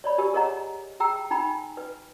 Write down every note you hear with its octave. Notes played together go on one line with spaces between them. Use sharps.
C#5 D5 B5
G4 A#4 G#5
G#4 A#4 C#5 D#5 F#5 A#5
G#4 G5 A#5 E6
D#4 G5 G#5 A#5 B5
B4